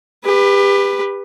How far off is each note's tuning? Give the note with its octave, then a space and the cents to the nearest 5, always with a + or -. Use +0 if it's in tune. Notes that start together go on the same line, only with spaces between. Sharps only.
G4 +30 B4 +0